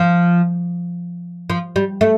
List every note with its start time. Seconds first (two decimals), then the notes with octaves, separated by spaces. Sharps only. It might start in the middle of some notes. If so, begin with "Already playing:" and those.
Already playing: F3
1.50 F3
1.76 G3
2.01 A3